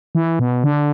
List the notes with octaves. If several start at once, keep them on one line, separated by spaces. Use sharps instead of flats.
E3
B2
D3